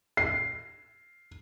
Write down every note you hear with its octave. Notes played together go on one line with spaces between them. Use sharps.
C7